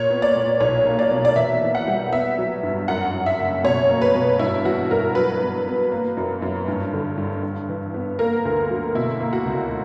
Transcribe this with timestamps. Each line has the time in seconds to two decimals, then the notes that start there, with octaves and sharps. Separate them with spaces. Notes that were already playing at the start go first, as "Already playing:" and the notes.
Already playing: A#2 C#5
0.10 B3
0.22 D5
0.36 A#2
0.60 B1 C#5
0.86 A#3
0.99 D5
1.11 B2
1.25 D5
1.36 E3 E5
1.62 E3
1.75 F#5
1.87 G3
2.12 B3 E5
2.38 F#3
2.63 G2
2.88 F#2 F#5
3.14 F#2
3.26 E5
3.39 F#1
3.64 B2 C#5
3.89 A#3
4.02 B4
4.15 B2
4.39 G2 E4
4.65 E3 F#4
4.90 G2 A#4
5.15 F#3 B4
5.40 B3
5.67 B3
5.92 A#3
6.17 F#2
6.42 F#2
6.68 G2
6.93 D3
7.18 G2
7.43 G2
7.69 E3
7.94 B3
8.19 A#3 A#4
8.45 D2
8.70 F#3
8.95 B2 E4
9.20 A#3
9.33 F#4
9.45 C#2